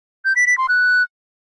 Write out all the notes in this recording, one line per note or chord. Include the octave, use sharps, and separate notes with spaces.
G6
B6
B6
C6
F#6